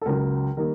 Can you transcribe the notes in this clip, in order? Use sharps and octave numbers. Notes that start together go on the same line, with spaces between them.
A4
C#2 C#3 F#3 A#4
D#3 G3 A#3 A#4